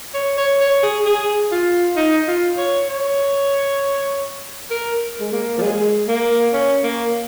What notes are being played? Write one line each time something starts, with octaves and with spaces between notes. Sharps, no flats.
C#5
C#5
C#5
G#4
G#4
F4
D#4
F4
C#5
C#5
A#4
G#3
A#3
F3
G#3
A#3
C#4
A#3